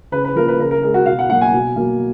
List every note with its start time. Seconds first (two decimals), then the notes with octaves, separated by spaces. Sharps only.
0.12 C#3 B4
0.24 B4
0.36 F3 A#3 A#4
0.48 B4
0.59 C#3 A#4
0.71 A#4
0.83 G#3 A#4
0.94 F#4
1.06 B2 F5
1.19 F#5
1.29 F#3 A#3 F#5
1.41 G#5
1.54 B2
1.76 F#3 A#3